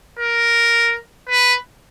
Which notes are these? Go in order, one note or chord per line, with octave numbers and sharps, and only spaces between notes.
A#4
B4